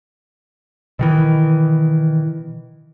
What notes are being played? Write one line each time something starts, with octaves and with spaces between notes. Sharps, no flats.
B2 D#3 E3